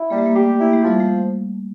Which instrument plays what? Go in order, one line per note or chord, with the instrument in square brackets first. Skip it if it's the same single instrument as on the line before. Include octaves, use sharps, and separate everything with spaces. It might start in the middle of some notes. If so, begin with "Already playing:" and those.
Already playing: [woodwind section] E4
[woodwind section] G3 [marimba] A#3
[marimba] A3
A#3
[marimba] A3 [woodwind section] G4
[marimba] A#3 [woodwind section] E4
[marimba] A3
[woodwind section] F3 [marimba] G3
[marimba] A3